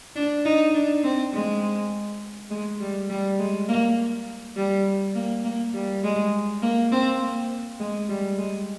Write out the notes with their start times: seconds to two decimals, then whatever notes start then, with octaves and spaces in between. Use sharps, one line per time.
0.16 D4
0.45 D#4
0.74 D4
1.04 C4
1.33 G#3
2.50 G#3
2.80 G3
3.10 G3
3.39 G#3
3.68 A#3
4.56 G3
5.15 A#3
5.44 A#3
5.74 G3
6.04 G#3
6.62 A#3
6.92 C4
7.21 A#3
7.80 G#3
8.09 G3
8.38 G#3